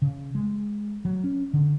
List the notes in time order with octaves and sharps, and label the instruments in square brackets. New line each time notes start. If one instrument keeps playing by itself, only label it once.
[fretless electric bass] C#3
G#3
F#3
C#4
D3